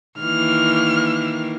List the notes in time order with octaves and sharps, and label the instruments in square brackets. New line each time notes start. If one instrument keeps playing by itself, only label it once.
[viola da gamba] D#3 E3 A#3 [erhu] F6